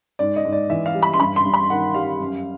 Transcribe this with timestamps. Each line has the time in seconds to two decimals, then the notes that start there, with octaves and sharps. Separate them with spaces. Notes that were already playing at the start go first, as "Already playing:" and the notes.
0.19 G#2 D5
0.36 D#5
0.45 G#2
0.53 D5
0.70 E3 E5
0.86 F5
0.95 G3
1.03 B5
1.14 C6
1.20 G2 B5
1.36 C6
1.45 G2
1.54 B5
1.70 D#3 F#5
1.94 G3 F5
2.20 F#2